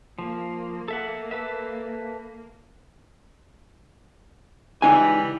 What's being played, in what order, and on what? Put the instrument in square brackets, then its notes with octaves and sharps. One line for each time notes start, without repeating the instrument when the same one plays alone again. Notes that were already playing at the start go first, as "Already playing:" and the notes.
[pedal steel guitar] F3 [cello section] A#3
[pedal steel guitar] A4 E5 F#5
A4 B4 E5
[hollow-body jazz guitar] C#2 D#4 G#5 [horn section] E3 G3